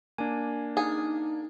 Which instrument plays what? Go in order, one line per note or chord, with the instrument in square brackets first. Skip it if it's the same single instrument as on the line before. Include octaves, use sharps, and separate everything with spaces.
[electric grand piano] A#3 D4 [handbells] G#5
[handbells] D#4 [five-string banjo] G#4